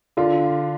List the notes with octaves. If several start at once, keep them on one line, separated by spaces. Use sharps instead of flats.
D3 F4